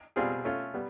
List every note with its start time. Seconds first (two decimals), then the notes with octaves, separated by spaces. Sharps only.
0.16 B2 G3 C4 F4 G#4
0.45 A3 C#4 F4
0.74 G3 B3